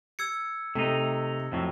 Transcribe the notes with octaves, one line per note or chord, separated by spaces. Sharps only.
E6 G#6 C#7
C3 A3 D#4
F2 A2 F#3